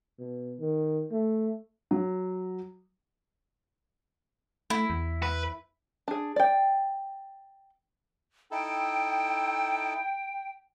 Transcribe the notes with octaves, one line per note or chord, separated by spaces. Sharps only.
B2
D#3
A3
F#3
A3 E4
E2
B4
D4 G#4
D5 G5
D#4 E4 A4 G5